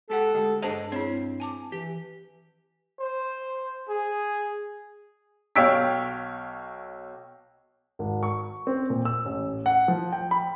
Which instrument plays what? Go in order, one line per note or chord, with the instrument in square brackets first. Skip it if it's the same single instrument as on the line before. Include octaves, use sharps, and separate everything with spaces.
[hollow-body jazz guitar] G#2 G4 F#5 [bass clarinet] A4
[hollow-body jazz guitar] D2 [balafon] G#3 G4 F#5
[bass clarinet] G2 [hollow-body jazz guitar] D4 G#4 D#5 [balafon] B4 C5 A5
[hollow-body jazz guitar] C4 [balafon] E4 G#4 C#5
[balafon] G#5 A5 D6
[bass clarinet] E3 [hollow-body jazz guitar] G4
[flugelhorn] C5
G#4
[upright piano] B1 C#5 F5 G5 E6 B6
[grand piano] G#1
C#6
C4
A#2
E6
A1
F#5
F3
G5
B5